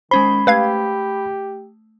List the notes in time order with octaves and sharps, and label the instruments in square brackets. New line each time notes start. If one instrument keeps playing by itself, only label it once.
[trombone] D#3 [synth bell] G#3 C#4 C5 [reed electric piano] B5
[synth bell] A3 [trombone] G4 [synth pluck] B4 F5 G#6